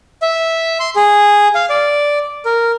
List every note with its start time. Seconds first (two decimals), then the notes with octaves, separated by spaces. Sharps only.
0.22 E5
0.80 C6
0.96 G#4
1.55 F5
1.70 D5
2.45 A#4